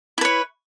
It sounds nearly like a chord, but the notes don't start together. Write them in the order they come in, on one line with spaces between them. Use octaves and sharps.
E4 B4 C#5